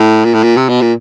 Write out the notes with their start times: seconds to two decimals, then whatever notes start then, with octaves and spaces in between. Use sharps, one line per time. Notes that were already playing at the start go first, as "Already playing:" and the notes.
Already playing: A2
0.25 A#2
0.34 A2
0.43 A#2
0.57 C3
0.69 B2
0.82 A#2